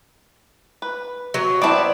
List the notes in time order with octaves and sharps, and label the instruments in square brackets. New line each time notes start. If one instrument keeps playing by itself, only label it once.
[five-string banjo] B4
[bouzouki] F#3
[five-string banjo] B3 C4 E4 [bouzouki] D5 A5